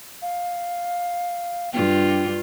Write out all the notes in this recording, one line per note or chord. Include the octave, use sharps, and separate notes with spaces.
F5
G2 F4 G5